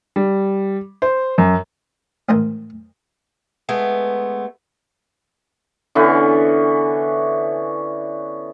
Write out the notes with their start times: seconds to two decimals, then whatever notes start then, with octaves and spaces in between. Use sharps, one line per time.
0.16 G3
1.02 C5
1.38 F#2
2.29 A1 G#2 D#3 E3 A#4 C5
3.69 G#3 A3 B3
5.95 D3 E3 B3 C#4